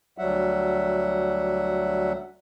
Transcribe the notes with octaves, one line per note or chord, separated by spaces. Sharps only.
D2 F#3 G3 E5 F#5